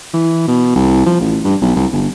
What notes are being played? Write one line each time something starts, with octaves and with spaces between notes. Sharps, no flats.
E3
B2
C2
F3
A1
G2
B1
C2
G1